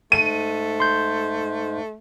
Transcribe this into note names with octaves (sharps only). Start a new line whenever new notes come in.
G#2 A3 D#7
C6 G6